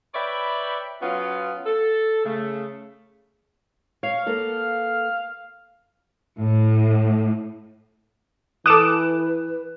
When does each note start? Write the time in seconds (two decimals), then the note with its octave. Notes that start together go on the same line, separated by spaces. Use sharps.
0.15 B4 C#5 D5 E5 G5 B5
1.02 F#3 B3 C#4 F4
1.66 A4
2.25 C#3 A3
4.03 C#5 F5
4.26 A#3 B3 A4
6.40 A2
8.66 E3 A4 B4 D6 D#6 F#6 E7